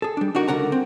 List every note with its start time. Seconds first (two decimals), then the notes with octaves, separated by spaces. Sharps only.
0.02 G#4 A4
0.17 G3 D4
0.35 D4 D#4 F#4 A#4
0.48 C#2 D3 A#4 F#5 A#5
0.72 C4